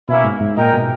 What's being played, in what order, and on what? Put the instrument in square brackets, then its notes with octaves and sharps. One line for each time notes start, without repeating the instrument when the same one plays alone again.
[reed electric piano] B2 [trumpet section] A#3 C#4 E4
[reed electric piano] G#2
G#2
[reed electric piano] A#2 [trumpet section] G#3 D#4 A#4 D#5 G5
[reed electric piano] B2